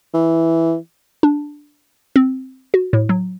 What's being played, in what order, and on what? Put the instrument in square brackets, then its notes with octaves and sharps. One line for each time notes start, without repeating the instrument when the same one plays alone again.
[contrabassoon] E3
[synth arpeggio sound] D4
C4
F#4
A2
F#3